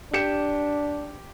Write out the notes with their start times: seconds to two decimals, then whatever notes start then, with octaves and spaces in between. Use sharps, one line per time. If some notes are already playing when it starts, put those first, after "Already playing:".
0.14 D4 G4 C#7 E7